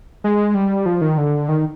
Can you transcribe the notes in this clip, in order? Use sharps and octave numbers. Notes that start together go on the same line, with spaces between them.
G#3
G3
F3
D#3
D3
D#3